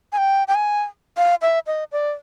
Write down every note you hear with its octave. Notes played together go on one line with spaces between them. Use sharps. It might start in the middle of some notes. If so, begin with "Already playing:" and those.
G#5
G5
G5
G#5
F5
E5
D#5
D5